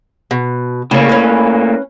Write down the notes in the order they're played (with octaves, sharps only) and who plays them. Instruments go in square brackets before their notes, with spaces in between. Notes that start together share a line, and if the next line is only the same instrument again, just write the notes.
[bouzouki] B2
[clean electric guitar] A2 A#3 [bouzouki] C#3 E4 C#5
[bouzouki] C#4 B4